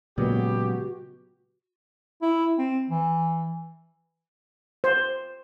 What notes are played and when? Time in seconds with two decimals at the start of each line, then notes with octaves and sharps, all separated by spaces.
0.18 A#2 C#3 F#3 G#3 B3 F#4 G4
2.22 E4
2.58 C4
2.90 E3
4.84 C5